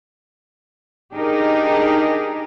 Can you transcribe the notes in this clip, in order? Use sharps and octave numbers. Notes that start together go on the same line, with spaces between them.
D4 D#4 G4 G#4 A#4 D#5